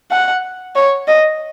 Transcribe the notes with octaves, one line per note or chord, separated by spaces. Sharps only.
F#5
C#5
D#5